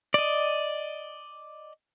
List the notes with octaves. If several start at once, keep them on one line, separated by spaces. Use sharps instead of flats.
D5 D#5